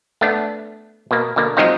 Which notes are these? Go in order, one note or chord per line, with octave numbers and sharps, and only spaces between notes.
A3 B3 D4
B2 A#3
B2 D3 A#3
F3 F#3 G#3 C4 D#4 F4